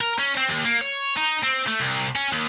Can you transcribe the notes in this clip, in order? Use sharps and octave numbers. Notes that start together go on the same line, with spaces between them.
A#4
C#4
C4
D#2
A#3
C#5
D#4
C4
A3
C2
C#4
D#2